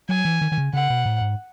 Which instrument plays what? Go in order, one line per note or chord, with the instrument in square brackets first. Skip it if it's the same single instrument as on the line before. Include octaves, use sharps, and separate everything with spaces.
[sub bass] F#3 [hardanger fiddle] G#5
[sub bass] E3
D#3
D#3
C#3
[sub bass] C#3 [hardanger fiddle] F#5
[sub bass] B2
A2
G#2